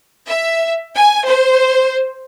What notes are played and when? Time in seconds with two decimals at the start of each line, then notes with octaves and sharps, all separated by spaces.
0.28 E5
0.95 G#5
1.26 C5